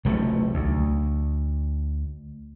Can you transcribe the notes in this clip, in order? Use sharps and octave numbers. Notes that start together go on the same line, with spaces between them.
C2 F3 F#3 A3
D2